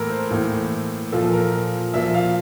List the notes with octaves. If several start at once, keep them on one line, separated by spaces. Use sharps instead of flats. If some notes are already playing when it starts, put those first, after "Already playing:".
Already playing: A2 E3 A#3 A4 A#4
C5
A2 E3 A#3
A#2 F3 A#3 A4
A#4
A#2 F3 A#3 E5
F5